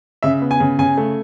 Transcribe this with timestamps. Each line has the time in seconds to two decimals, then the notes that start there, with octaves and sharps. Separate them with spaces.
0.23 C#3 E5
0.42 B3
0.51 G#5
0.60 C#3
0.79 C#3 G#5
0.97 A3